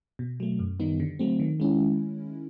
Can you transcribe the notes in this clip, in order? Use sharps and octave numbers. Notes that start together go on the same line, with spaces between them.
B2
F#3 A3
F#2
D#3 G3 B3 D#4
D3
F#3 A3 C4
D#3
G#3 C#4 E4